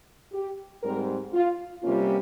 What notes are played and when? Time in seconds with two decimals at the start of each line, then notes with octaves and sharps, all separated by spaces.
0.33 G4
0.83 G#2 G3 C4 A#4
1.33 F4
1.82 C3 G3 A#3 C#4 F4